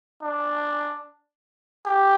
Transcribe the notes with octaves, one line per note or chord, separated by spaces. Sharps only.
D4
G4